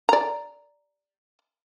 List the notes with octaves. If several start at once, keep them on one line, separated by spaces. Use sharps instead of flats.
D5 A#5